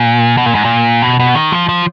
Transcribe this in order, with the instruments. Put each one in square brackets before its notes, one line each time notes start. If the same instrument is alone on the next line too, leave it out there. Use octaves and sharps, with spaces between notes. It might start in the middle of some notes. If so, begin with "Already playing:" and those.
Already playing: [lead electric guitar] A#2
B2
A#2
G#2
A#2
B2
B2
D#3
F3
F3